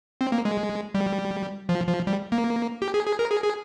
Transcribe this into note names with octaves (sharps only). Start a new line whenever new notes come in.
C4
A#3
G#3
G3
F3
F3
G3
A#3
G4
G#4
G#4
A#4
G#4
G#4